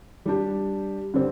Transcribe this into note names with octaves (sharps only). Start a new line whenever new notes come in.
G3 D4 G4
D3 G3 C4